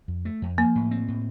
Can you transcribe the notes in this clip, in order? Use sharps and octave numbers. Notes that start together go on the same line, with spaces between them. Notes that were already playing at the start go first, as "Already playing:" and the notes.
F2
A3
F2
F3 A#3
A2
C4
A2